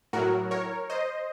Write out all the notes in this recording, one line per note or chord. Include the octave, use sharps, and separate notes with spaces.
A2 F#3 F#4 A#4
A#4 C#5
C5 D#5